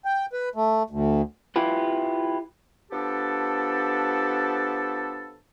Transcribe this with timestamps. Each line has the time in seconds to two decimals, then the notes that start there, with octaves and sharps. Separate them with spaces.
0.05 G5
0.33 B4
0.55 A3
0.90 D2
1.56 E4 F4 G4 B4
2.92 F3 B3 D4 G4 A4